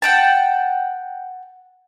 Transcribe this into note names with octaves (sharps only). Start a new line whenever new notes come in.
F#5 G5 A5